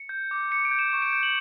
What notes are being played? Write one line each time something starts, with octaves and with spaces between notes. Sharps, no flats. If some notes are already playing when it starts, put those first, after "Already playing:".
Already playing: C#7
G6
D6
D6 C#7
D7
G6
E7
C#6 E7
D7
G6 E7
F#7